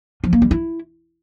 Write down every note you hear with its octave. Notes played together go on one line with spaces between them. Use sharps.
F3
A#3
G3
E4